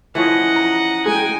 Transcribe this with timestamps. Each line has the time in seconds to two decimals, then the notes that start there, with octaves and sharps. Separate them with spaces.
0.15 E3 F3 C#4 D#5 F#5
0.56 A#5
1.06 G#3 G5 G#5